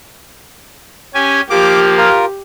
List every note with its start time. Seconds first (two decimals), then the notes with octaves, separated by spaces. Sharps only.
1.14 C#4 G4 G#5
1.50 F3 A#3 G4 D6
1.98 F4 A#4